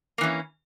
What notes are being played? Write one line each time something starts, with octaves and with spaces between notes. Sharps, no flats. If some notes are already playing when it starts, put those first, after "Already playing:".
E3 A#3 C#4